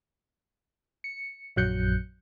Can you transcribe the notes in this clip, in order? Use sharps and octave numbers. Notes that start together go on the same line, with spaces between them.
C#7
A#1 F#2 F#3 F#6 G6 C#7